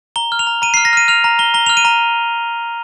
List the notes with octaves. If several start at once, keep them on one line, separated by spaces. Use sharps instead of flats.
A#5 G7
F6
F7
A#5
A#5 D#7
F6 C7
A#6
F6 D#7
F6 F7
A#5
A#5 G7
A#5 G7
F6 F7
D#7
A#5